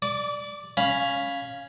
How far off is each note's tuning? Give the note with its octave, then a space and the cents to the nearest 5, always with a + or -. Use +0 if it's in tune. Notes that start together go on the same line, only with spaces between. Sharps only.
D5 +0 D6 -30
C#4 +0 F5 +5 B5 +0